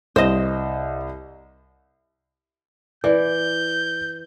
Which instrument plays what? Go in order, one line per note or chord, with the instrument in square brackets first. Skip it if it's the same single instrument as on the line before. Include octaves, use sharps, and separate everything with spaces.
[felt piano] C2 [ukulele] C5 D#5
[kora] E3 [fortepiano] D5 [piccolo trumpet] G6